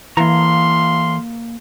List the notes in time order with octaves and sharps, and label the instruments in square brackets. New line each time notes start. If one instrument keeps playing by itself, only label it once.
[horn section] A2 F5 C6 [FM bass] E3 [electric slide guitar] A#3 A#5